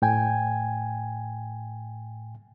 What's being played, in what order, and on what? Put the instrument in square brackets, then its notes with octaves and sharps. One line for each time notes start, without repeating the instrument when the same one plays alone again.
[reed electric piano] A2 G5 G#5